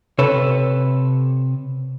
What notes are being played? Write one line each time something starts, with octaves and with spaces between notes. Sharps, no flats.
C3 A4 B4 C#5